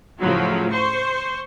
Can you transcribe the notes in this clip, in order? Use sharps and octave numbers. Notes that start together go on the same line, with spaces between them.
A2 C#3 F3 F#3
C5 C#6